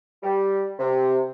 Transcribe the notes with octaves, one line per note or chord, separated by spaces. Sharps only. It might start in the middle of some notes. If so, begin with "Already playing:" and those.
G3
C3